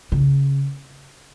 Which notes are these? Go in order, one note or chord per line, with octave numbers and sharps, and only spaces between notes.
C#3